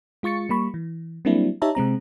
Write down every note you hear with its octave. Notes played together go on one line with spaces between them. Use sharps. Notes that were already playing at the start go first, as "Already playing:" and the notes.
G#3 F4 C#6 A6 C#7
G3 A#3 B5 C#6
E3
F#3 G3 A#3 C4 D4 E4
D#4 G4 C#5 E5 A5 A#5
C3 G#3 C4 A#5